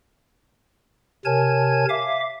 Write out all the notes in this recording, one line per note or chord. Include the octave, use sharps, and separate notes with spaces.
C3 A#4 C#5 G#5 A5 G#6
E5 F5 D6